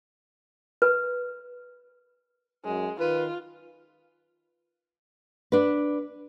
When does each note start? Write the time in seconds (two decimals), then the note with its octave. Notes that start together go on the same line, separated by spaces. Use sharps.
0.82 B4
2.65 F#2 G#3
3.00 D#3 F4 B4
5.52 D4 B4